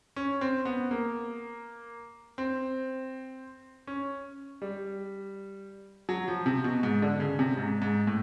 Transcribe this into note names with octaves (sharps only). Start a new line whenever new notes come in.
C#4
C4
B3
A#3
C4
C#4
G3
F#3
F3
C3
B2
G#2
D3
C#3
C3
G#2
G#2
A2